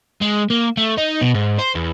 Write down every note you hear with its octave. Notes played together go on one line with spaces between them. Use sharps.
G#3
A#3
A3
D#4
B2
G#2
C5
E2